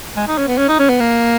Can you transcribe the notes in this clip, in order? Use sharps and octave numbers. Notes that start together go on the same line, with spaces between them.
G#3
D#4
C#4
B3
C#4
D#4
C#4
B3
A#3